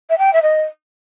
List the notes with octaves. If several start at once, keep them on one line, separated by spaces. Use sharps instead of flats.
E5
G5
E5
D#5